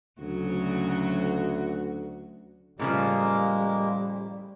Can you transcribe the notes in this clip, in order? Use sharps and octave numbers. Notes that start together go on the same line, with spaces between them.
D2 C#3 F#3 F#4
A2 C#3 F3 G3 G#3 A#3